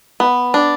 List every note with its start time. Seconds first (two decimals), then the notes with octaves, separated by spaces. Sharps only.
0.20 B3
0.54 D4